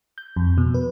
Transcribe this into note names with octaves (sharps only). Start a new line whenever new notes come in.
G6
F2
B2
B4